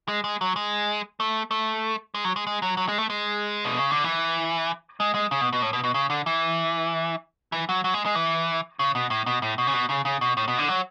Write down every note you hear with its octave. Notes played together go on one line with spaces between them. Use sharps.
G#3
G#3
F#3
G#3
A3
A3
G#3
F#3
G#3
G#3
F#3
F#3
G#3
A3
G#3
B2
C#3
D3
E3
G#3
G#3
C#3
B2
B2
A2
B2
B2
C#3
D3
E3
E3
F#3
F#3
G#3
G#3
E3
C#3
B2
A2
B2
A2
B2
C#3
B2
C#3
C#3
B2
A2
B2
D3
F#3